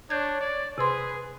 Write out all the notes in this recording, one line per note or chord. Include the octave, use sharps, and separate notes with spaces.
D4 C#5 G6 G#6
D5
C3 G#4 B4 C6